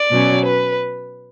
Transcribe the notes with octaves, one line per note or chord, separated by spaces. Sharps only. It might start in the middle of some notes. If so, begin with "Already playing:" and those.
Already playing: D5
B2 F#3 C#4
B4